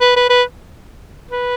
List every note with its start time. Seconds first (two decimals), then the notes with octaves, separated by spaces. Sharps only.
0.01 B4
0.16 B4
0.30 B4
1.31 B4